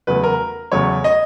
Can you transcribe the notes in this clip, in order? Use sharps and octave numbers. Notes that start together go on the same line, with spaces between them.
E2 C#3 F#3 A3 B4
A#4
E2 C#3 F#3 A3 C#5
D#5